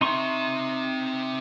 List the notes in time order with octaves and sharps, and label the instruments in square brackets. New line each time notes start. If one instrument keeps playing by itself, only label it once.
[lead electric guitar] C4 E5 [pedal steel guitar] D#4 C6 C#6